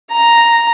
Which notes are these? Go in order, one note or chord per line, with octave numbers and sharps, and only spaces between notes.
A#5